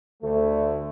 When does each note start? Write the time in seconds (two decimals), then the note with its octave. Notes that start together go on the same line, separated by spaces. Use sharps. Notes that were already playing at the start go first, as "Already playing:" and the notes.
0.23 D2 A3